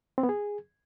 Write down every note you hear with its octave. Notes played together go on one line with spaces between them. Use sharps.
C4
B3
G#4